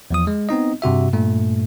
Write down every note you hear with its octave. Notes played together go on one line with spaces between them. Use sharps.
E2 F3 D#6
G#3
B3 C4 D#4 D#5
G2 C3 F#4 E5
G2 A#2 A3